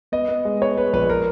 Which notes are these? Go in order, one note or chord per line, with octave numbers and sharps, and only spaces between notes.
B3 D#5
B3
G#3
B3 C#5
G#3 B4
A#1 B4
A#4